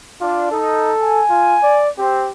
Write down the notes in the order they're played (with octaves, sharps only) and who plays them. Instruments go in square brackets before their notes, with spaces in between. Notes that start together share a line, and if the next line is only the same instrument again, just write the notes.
[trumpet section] D4 [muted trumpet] F4
[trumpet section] D#4 [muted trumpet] A4
[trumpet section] G#5
[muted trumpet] F4
D5
[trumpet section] C4 [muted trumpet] G4